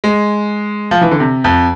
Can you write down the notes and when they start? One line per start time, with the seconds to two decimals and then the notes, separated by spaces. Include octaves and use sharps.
0.04 G#3
0.91 F3
1.01 E3
1.11 D3
1.20 C3
1.44 F2